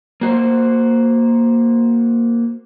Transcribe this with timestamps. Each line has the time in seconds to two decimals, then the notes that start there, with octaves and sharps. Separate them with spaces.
0.21 A#3 F#4 C5